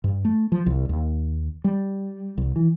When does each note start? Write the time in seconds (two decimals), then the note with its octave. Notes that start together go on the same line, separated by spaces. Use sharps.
0.04 G2
0.25 A3
0.52 F3
0.66 C2
0.89 D#2
1.64 G3
2.38 C2
2.56 E3